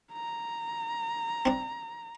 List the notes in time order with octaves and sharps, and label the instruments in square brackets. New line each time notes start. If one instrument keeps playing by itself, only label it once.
[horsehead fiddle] A#5
[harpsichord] C4 D4